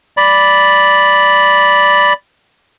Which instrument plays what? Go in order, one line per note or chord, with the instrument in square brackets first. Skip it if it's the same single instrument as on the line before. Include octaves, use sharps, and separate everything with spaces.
[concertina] D5 B5